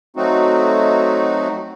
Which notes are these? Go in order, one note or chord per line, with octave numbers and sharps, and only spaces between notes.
F#3 A3 C4 D#4 F#4